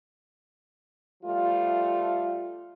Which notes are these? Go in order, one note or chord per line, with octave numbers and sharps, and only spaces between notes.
F3 G3 A3 F4